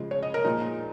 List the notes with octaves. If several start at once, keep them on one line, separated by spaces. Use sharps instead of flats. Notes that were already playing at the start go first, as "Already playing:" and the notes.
Already playing: C#3 F3 G#3
C#5
D#5
A#4
A#2 F3 G#3 D#4